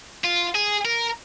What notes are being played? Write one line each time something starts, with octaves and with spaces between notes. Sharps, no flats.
F4
G#4
A#4